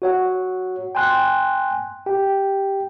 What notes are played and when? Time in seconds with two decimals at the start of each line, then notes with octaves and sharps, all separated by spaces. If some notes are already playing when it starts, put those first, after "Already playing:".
0.02 F#4 C#5 F#5
0.95 G5 G#5 C6 F#6
2.06 G4 G5